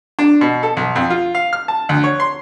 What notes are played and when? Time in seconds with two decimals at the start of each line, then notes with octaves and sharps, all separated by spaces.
0.19 D4
0.41 B2
0.63 A4
0.77 B1
0.96 F2
1.10 F4
1.35 F5
1.53 F6
1.68 A5
1.89 D2
2.04 C#5
2.20 C6